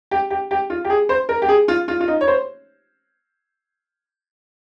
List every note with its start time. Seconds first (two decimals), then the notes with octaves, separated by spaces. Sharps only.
0.11 G4
0.30 G4
0.51 G4
0.70 F4
0.85 G4
0.90 G#4
1.09 C5
1.29 A#4
1.42 G4
1.49 G#4
1.68 F4
1.88 F4
2.00 F4
2.08 D#4
2.21 C#5
2.28 C5